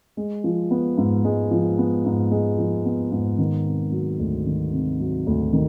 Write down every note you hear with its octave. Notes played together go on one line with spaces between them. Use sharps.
G#3
F3
B3
G#2
G#3
F3
B3
G#2
G#3
F3
B3
G#2
D#3
C3
F#3
D2
D#3
C3
F#3
D2
D#3